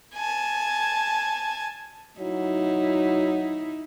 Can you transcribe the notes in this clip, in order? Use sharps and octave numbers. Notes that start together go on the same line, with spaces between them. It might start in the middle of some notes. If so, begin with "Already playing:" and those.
G#5 A5
F#3 D#4 E4